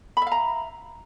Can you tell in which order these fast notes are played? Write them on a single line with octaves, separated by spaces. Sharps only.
B5 E5 F5 A#5